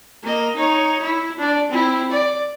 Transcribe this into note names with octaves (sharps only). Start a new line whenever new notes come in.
A#3 D#5
D#4 C#5
E4
D4 D5
C4 E4
D5